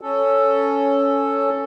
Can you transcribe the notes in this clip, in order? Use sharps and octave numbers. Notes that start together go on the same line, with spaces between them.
C#4 A4